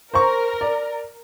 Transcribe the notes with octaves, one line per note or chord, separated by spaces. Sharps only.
A#4 C5 A#5 C#6
D5